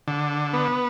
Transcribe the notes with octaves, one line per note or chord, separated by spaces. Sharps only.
D3
B3